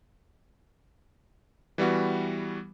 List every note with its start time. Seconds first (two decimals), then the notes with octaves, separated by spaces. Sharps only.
1.78 E3 G3 B3 F#4